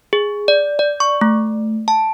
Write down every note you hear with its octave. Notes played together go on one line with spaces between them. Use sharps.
G#4
D5
D5
C#6
A3
A5